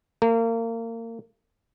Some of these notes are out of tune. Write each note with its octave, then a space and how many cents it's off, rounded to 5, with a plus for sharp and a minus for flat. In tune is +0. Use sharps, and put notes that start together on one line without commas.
A#3 -30